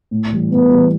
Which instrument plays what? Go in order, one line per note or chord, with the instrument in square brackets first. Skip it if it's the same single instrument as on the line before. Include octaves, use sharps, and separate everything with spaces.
[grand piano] A2
E3 G3
[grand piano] A2 [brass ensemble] B3
[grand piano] E3 G3